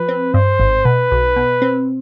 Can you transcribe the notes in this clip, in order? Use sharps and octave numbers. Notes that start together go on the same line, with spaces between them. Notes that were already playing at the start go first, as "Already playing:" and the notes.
Already playing: F3 B4
C4
G2 C5
G#1
B2 B4
B1
B2
C4